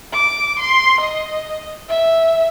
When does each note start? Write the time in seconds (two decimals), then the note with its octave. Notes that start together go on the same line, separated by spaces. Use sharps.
0.12 D6
0.59 C6
1.01 D#5
1.88 E5